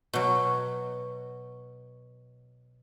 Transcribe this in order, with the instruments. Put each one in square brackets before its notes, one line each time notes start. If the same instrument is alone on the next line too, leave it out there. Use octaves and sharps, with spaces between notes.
[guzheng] B2 F#3